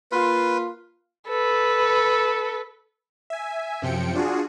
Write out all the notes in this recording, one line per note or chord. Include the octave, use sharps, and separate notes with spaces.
A#3 F4 B4
A4 B4
E5 G#5
F#2 C3 F3 G5 C#7 D7
D4 F4 F#4 G#4